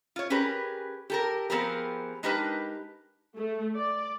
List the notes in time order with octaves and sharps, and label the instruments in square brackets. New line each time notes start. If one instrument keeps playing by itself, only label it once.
[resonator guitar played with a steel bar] F4 C#5
C#4 G4 G#4 A#4 B4
G4 A4 A#4
F3 B3 C4 G4 G#4 A#4
G#3 D4 D#4 G4 A#4 B4
[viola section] A3
D5